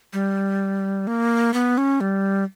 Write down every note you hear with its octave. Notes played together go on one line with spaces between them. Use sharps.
G3
A#3
B3
C#4
G3